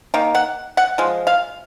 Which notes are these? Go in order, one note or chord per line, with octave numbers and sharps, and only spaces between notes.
D#3 A#3
F#5
F#5
F3 G#3
F5